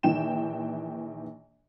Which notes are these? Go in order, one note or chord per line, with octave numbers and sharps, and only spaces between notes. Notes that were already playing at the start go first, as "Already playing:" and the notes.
A#1 D#3 E3 G5 E7